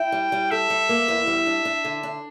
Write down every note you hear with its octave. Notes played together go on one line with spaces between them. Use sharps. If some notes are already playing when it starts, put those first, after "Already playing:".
Already playing: E4 G5
G3
G3
A4 E5
G3
A#3
E2
G3
D4
D4
D3
D4